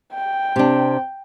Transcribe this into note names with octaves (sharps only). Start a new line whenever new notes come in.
G5
C3 D4